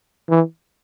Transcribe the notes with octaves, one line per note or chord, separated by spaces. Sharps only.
E3